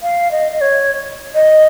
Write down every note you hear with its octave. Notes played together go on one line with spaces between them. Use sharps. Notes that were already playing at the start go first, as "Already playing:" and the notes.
F5
D#5
D#5
C#5
D#5